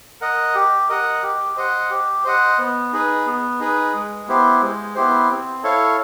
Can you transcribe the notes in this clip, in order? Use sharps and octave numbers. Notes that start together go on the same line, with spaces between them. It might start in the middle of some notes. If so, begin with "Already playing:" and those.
A#4 D#5 F#5
G4
A#4 D#5 F#5
G4
C5 D#5 F#5
G4
C5 D#5 F#5
B3
D#4 G#4 B4
B3
D#4 G#4 B4
G#3
B3 E4 G4 C5
G#3
B3 E4 G4 C5
C4
E4 A4 C#5 F5